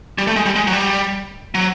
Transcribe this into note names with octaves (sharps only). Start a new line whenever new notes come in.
G3
A3
G#3
G3
G#3
F#3
G3
F#3